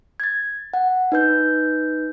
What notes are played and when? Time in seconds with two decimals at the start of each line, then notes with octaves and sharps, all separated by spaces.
0.20 G#6 A6
0.74 F#5
1.12 D#4 B4 G6